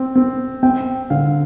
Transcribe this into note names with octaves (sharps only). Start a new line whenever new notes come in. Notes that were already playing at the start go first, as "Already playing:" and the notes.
Already playing: C4
C4
C4 G5
D3 F5